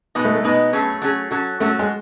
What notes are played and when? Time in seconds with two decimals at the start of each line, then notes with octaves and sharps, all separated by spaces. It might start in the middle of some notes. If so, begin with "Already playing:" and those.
0.15 B2 G#3 B3 D#4
0.25 A3
0.35 A3
0.44 B2 G#3 B3 D#4
0.73 F#3 A3 C#4 G#4
1.02 F#3 A3 C#4 G#4
1.31 F#3 C#4 F#4 A4
1.60 F#3 A3 C#4 F#4 A4
1.79 G#3